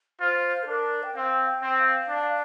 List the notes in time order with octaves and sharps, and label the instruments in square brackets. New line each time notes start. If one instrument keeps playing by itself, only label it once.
[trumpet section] F4 [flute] C5
[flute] A4
[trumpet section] D4 [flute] A#4
[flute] G5
[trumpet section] C4 [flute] F5
[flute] G5
[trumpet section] C4
[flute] F5
[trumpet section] D4